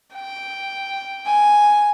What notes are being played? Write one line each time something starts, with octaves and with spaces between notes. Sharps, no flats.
G5
G#5